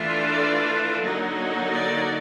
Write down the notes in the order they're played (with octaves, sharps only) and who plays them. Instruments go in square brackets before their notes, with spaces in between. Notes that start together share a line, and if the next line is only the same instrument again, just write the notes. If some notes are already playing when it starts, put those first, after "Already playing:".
Already playing: [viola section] E3 A3 D4 F4
D5
D3 F#3 A#3 D#4
D5